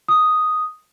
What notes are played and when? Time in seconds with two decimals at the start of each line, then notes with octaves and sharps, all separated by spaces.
0.08 D#6